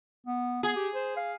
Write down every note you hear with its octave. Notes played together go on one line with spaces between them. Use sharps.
B3
B3 G#4
G4
C5
F5